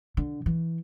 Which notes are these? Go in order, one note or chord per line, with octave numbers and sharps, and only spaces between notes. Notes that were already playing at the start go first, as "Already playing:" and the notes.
D3
E3